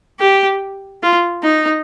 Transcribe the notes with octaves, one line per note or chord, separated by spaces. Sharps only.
G4
F4
D#4